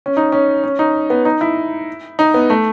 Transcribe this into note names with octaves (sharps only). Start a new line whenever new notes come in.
C#4
D#4
C#4
C#4
D#4
B3
D#4
E4
D#4
B3
A3